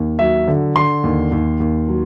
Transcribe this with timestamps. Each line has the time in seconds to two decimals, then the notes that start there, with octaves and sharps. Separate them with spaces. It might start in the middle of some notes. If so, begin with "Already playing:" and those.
Already playing: D#2
0.19 F#3 E5
0.48 D3
0.76 D3 C6
1.04 D#2
1.32 D#2
1.60 D#2
1.88 F#3